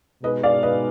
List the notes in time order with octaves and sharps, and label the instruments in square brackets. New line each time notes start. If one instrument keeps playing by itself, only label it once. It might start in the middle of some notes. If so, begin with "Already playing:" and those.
[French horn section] B2 G#3 D#4 G#4 [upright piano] B4 D#5
[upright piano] D5 F5
B4 D#5